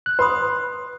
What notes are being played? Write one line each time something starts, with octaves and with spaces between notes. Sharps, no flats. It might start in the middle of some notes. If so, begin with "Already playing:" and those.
F#6
B4 B5 C6 D#6